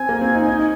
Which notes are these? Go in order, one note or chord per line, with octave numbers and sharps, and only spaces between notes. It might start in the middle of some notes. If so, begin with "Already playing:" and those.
Already playing: C4 G#5
A#3
C4
D#4
D#4